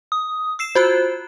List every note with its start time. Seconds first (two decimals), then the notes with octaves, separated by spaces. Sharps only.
0.12 D#6
0.59 E6 C7 E7
0.75 F4 F#4 C5 F#6